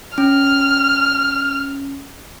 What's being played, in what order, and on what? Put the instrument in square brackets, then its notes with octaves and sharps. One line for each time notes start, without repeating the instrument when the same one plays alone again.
[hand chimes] C#4 [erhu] F6